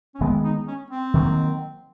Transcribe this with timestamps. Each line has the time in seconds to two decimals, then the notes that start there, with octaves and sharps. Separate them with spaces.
0.15 C#4
0.21 D#3 G#3 B3 C4
0.44 D#4
0.68 C#4
0.91 C4
1.14 D#3 F#3 A#3